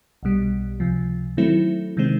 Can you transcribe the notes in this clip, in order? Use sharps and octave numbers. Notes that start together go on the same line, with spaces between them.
B1 B2 G3
C#2 C3 F3
D#3 F#3 A3 C4 E4
C3 D#3 G#3 C4